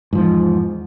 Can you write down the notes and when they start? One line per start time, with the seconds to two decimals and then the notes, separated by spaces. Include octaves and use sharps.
0.13 G#2
0.15 F3
0.18 E2